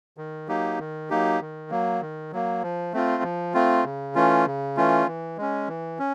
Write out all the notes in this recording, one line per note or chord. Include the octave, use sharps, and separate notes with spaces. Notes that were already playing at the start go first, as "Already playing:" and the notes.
D#3
F#3 A#3 D#4 G4
D#3
F#3 A#3 D#4 G4
D#3
F#3 A#3
D#3
F#3 A#3
F3
A3 C4 F4
F3
A3 C4 F4
C#3
E3 A3 C#4 F4
C#3
E3 A3 C#4 F4
E3
G#3 C#4
E3
C#4